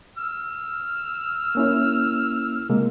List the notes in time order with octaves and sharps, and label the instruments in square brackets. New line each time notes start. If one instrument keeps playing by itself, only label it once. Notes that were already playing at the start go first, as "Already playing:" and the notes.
[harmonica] E6 F6
[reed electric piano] A#3 C#4 E4
C3 G#3 A#3